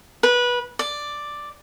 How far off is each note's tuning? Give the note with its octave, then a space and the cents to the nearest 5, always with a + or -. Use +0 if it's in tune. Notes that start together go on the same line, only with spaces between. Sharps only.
B4 -20
D5 +5